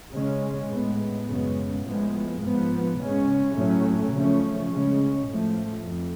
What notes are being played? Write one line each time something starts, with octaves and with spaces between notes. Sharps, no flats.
C#3 G#3 C#4
A2 G#3 B3
F#2 C#3 G#3 B3
A2 F3 G#3 B3
G#2 F3 B3
C#3 G#3 C#4
A2 F#3 A3 C#4
C#3 F3 A3 C#4
C#3 G#3 C#4
A2 F3 A3
F2